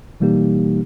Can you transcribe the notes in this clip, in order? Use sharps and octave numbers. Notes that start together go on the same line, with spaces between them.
B2 E3 G3 A#3 D#4 G4